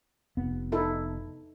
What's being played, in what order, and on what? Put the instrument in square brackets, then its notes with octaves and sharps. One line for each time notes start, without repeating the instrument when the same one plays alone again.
[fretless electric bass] F1 B3
[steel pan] D#4 E4 A4